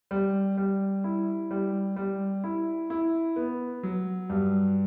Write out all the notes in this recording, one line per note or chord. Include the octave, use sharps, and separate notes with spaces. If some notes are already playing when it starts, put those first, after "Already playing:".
G3
G3
E4
G3
G3
E4
E4
B3
F#3
G2